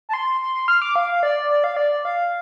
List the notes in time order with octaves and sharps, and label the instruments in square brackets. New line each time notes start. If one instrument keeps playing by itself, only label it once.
[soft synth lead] A5
C6
C6
C6
F6
D6
F5
D5
D5
F5
D5
F5